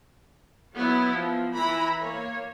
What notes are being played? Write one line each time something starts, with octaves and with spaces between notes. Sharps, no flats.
F#3 B3 E4
F3
E3 E4 A#5 B5
A#3 C#5